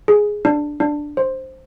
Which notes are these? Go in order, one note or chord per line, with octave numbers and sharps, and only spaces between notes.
G#4
D4
D4
C5